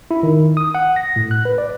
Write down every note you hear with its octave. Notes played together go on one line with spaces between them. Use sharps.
E4
D#3
D#6
F#5
A#6
A2
F#6
B4
D5